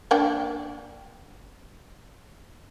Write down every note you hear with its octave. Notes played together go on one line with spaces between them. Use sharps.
A#3 D4 G5